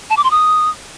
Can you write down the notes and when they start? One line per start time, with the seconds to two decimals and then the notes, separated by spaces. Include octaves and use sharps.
0.10 A5
0.17 D6
0.24 C6
0.31 D#6